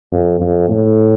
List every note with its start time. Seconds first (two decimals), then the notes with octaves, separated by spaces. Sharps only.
0.12 F2
0.40 F2
0.69 A2